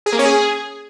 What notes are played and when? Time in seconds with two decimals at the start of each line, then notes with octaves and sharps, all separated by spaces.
0.06 G#4
0.13 A#3
0.19 C#4
0.25 G#4